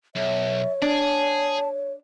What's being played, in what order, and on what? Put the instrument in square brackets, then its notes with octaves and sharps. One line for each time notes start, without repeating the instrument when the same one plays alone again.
[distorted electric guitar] B1 [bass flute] C#5 [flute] E5
[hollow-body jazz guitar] D4 [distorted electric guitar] G#4 [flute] A5